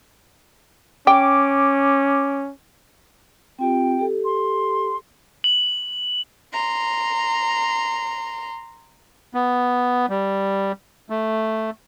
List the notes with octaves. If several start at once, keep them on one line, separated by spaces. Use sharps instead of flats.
C#4 G5 D6
C4 F4 G4 G5
G4 A4
C6
F#7
A#5 C6
B3
G3
A3